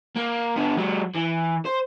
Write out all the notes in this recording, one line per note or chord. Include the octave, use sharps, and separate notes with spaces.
A#3
D3 B3
F#3 G#3
E3
C5